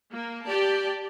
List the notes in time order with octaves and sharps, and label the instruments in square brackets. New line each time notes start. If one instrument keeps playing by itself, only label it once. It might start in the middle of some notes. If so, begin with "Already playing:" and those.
[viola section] A#3
G4 D5 A5